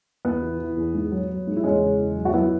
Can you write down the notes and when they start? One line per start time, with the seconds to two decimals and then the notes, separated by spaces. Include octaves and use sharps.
0.25 E2 B3
0.43 E3
0.59 E3
0.77 E2
0.94 G#2
1.11 F#3
1.29 F#3
1.47 G#2
1.56 E4
1.63 E2 G#3 C#4
1.81 C#3
1.99 E2
2.16 F#3
2.25 F#4
2.34 F#2 B3 E4